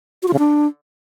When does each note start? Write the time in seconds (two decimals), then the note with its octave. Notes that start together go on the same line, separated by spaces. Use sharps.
0.23 F#4
0.28 F4
0.33 C#3
0.39 D4